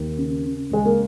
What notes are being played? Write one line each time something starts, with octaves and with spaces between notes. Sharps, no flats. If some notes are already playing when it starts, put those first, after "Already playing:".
Already playing: D#2
C#3
C#3
C#2 G#3
A#3